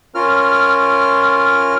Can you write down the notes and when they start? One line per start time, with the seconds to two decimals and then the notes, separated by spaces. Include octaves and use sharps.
0.15 C#4 F4 A#4 F6